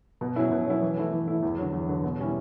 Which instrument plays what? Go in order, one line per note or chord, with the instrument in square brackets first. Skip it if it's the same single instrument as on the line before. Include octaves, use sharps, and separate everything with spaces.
[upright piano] B2
F#3 C#4 E4
B2
F#3 C#4 E4
E3
A3 E4
E3
A3 E4
E2
D3 F#3
E2
D3 F#3
B2
G3 C#4 E4